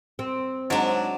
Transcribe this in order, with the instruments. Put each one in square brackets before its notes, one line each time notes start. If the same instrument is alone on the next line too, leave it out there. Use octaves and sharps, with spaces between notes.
[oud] C4
[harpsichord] G#2 [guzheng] F#3 D4